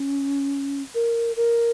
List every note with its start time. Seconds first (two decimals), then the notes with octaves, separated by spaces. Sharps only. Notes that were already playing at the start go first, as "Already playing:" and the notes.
Already playing: C#4
0.95 A#4
1.36 A#4